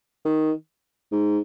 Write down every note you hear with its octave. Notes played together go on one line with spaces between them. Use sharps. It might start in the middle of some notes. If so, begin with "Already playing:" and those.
D#3
G#2